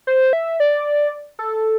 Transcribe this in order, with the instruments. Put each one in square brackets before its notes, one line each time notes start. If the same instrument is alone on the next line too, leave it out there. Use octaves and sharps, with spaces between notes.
[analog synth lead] C5
E5
D5
A4